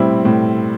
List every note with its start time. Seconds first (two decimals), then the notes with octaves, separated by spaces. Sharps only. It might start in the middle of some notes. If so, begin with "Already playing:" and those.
Already playing: A2 G3 C4 E4
0.25 A2